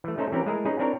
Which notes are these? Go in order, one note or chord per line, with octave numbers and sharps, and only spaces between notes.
E3 A3
A3 C#4 D#4 A4 C5 E5
E3 C4 C#4 G4 A#4
G#3 A3 E4 G#4 A#4
C#4 D#4 G#4 B4
C4 D4 E4 A#4 C#5